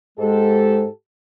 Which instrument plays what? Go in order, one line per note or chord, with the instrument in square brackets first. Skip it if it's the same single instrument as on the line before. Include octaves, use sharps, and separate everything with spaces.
[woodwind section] G#2 G#3 [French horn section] G4 A4